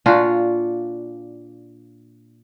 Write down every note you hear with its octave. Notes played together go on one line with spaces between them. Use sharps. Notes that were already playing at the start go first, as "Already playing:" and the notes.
A#2 D4 F4 F#4